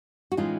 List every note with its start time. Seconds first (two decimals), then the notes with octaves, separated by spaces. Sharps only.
0.32 F#4
0.37 A2 E3 G#3 C#4 D#4 F4